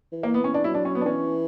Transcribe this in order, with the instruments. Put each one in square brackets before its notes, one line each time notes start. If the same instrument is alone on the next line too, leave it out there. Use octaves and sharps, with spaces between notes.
[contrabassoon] E3
[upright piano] A#3
B3
C#4
D4
[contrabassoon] F#3 [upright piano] E4
[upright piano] D4
C#4
B3
D4
[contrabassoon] E3 [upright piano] C#4